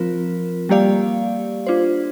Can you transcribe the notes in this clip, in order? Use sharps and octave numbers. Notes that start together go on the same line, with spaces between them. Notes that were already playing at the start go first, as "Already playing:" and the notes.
Already playing: F3 C4 F4 A#4
G3 A#3 G4 D5 F5
D4 F4 C5